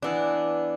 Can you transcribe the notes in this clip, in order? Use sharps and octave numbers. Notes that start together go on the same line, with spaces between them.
E3 B3 D4